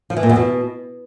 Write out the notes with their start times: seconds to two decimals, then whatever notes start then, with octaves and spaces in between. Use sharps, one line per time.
0.10 F3
0.17 E3
0.23 A#2
0.29 E2
0.36 B2